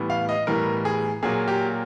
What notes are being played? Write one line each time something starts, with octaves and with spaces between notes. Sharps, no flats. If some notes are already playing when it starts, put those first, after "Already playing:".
Already playing: A2 E3 G3 B3
F5
D#5
A2 E3 G3 B3 A#4
G#4
A#2 F#3 A#3 G#4
G4